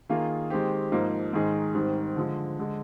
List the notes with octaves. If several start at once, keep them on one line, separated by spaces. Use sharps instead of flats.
D#3 A#3 F4 G#4
D#3 G#3 C4 G4
G#2 F3 A#3 D#4
G#2 D#3 G#3 D#4 G#4
G#2 D#3 G3 C4
D3 F3 G#3
D3 G#3